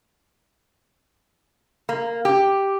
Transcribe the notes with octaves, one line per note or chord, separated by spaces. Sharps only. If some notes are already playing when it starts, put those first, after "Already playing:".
A#3
G4